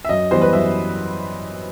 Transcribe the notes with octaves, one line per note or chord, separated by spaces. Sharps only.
E5
F#2 D#5
E3 G3 B3 C5
B4
F#2 E5